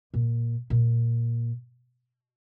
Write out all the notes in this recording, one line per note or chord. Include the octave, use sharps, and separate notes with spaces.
A#2
A#2